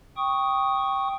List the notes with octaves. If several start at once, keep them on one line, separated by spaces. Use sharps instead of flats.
G5 C#6 D#6